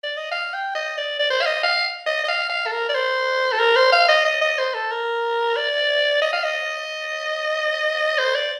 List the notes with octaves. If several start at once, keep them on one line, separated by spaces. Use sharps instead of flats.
D5
D#5
F5
G5
D#5
D5
D5
C5
F5
D#5
F5
D#5
D#5
F5
F5
A4
A#4
D5
C5
A4
A#4
C5
F5
D#5
D#5
D#5
C5
A4
A#4
D5
D#5
F5
D#5
C5
D5